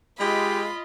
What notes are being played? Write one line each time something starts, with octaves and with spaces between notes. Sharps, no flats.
G#3 F4 G4 D#5 B5